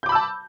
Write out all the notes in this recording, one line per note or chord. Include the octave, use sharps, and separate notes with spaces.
A5 B5 D6 E6 G6